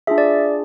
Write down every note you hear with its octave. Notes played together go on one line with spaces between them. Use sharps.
D4 F4 G#4 E5
D5